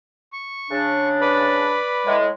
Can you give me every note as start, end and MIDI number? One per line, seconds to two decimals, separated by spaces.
0.33 1.09 85
0.71 1.76 49
0.71 1.76 62
1.21 2.16 71
1.21 2.16 74
1.21 2.16 83
2.07 2.28 45
2.07 2.28 56